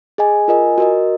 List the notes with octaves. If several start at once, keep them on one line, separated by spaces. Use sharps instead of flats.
G#4 D#5 G#5
F4 A#4 D#5 G#5
F#4 A#4 D#5